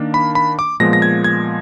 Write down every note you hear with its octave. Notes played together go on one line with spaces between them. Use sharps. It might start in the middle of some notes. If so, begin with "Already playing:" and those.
Already playing: D#3 A#3 D4
B5
B5
D6
A#2 F3 G#3 B3 A#6
A#6
G#6
G#6